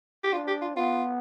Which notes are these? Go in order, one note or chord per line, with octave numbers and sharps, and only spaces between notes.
G4
D4 F4
G4
F4
B3 F4